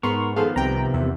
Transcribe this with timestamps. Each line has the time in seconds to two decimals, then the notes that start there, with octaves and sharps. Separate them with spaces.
0.03 G#2 B3 A#4 C6 C#6
0.36 D#3 F3 B3 G#4 A4 F5 C6
0.56 C2 C3 G5 A#5
0.94 E2 E5